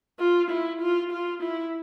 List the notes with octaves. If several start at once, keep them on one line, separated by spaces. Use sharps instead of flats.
F4
E4
F4
F4
E4